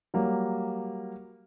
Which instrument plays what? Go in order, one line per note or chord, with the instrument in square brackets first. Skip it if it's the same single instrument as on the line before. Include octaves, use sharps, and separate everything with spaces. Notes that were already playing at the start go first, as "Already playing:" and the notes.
[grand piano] F#3 G3 A#3